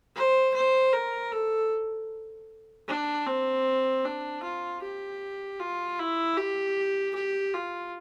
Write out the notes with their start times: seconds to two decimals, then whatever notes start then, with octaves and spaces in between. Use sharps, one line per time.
0.15 C5
0.54 C5
0.93 A#4
1.32 A4
2.88 D4
3.27 C4
4.05 D4
4.43 F4
4.83 G4
5.60 F4
5.99 E4
6.38 G4
7.16 G4
7.54 F4